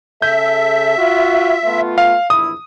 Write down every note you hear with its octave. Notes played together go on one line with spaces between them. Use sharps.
C#3 G#4 A4 E5 G6
F4 F#4
A3 B3 F4
F5
A#1 E2 E4 D#6